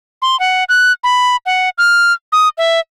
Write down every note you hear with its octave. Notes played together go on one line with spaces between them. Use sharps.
C6
F#5
F#6
B5
F#5
F6
D#6
E5